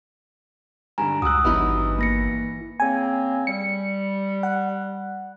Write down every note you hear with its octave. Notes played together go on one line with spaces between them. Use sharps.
G2 D3 G#5 A#5
C#2 F#4 D#6 E6 F#6
G#1 G2 E3 F#3 B3 D#4 E4
A#3 A#6 C#7
C#3 A#3 C4 G#5
G3 C#7
F#5